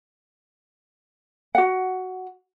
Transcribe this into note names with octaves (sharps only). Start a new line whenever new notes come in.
F#4 F#5